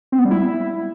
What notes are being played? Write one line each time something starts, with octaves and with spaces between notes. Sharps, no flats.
C4
B3
G3
E4